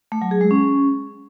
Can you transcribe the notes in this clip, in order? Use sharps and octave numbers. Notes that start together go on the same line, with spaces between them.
A3
F#3
G#4
G#3
C#4